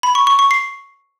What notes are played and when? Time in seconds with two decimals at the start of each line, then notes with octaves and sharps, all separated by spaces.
0.03 B5
0.15 C#6
0.27 C#6
0.39 C#6
0.51 C7